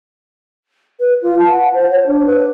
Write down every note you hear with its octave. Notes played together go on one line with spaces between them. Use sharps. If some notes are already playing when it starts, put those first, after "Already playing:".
B4
F4
A5
F#5
C5
C#5
D4
B4